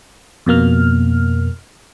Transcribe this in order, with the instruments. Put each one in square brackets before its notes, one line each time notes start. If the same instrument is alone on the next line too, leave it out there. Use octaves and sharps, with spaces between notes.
[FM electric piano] F2 B2 A#3 F6